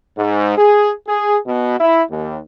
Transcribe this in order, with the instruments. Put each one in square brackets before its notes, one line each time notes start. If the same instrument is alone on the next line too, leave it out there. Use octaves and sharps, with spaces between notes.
[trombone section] G#2
G#4
G#4
B2
E4
D#2